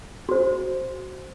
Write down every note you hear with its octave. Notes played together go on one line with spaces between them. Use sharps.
F#4 C5